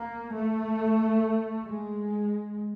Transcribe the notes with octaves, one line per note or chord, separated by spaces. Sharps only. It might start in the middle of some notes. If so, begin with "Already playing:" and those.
Already playing: A#3
A3
G#3